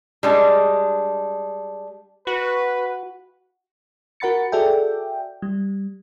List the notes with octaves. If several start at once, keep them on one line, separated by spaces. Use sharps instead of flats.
G3 G#3 D4
F#4 B4
F#4 A#4 F#5 B5 A6 C#7
F#4 G#4 A4 D5 E5 G5
G3